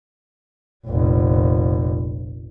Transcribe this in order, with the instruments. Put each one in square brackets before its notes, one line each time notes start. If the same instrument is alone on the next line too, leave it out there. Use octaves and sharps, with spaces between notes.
[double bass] F1 A#1